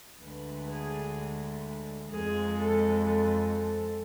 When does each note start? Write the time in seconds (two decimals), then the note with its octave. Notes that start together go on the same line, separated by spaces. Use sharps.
0.22 D2 D3 G#3 B4
0.69 G#4
2.09 F2 F3 G#3 G#4
2.57 A4
3.03 A4
3.50 A4